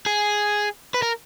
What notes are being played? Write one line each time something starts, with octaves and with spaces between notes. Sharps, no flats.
G#4
B4
A#4